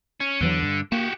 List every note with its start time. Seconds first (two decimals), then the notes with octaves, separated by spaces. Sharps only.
0.20 C#4
0.41 E2 D3 E3 F#3
0.63 G2
0.92 A#3 F#4 G4